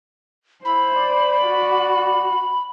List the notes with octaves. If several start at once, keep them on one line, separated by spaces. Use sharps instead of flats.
E4 C5 B5
D5
F#4